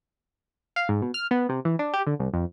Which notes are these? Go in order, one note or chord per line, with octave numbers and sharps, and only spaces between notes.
F5
G#2
B2
F6
B3
C3
E3
D4
G4
D3
C2
F2